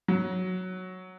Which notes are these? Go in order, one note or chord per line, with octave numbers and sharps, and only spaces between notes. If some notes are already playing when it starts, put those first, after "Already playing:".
F#3